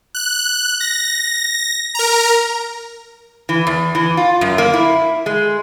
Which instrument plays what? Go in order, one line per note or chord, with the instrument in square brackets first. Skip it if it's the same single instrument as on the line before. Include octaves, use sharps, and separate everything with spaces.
[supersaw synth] F#6
A#6
A#4 A#5
[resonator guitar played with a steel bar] E3
E2
E3
F4
F#2
A#3
E4
G#3